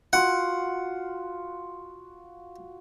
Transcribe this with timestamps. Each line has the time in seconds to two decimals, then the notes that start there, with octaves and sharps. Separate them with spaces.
0.13 F4 F#4 F#5